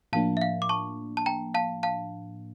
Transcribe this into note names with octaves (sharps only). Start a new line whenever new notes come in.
A2 F3 A#3 D4 F5 A5
E5
F5
D6
A5 C#6
A5
G5 A#5
F5 A5
F5 A5